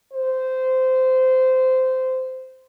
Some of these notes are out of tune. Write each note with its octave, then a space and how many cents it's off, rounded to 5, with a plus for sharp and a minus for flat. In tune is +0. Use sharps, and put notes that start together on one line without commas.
C5 -15